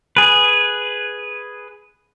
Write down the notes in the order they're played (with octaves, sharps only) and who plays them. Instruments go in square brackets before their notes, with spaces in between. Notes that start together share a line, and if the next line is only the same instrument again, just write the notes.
[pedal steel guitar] G#4 B4